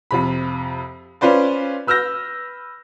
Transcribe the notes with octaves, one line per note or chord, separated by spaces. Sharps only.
F2 C3 B5
C#4 F4 B4 C5 D5
B4 E6 F6 G6 A#6